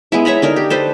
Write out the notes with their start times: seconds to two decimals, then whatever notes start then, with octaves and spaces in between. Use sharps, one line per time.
0.12 G#3 B3 E4
0.25 C#5 E5 A#5 B5
0.42 D3 D#4 A#4
0.56 G4
0.70 A4 B4 C5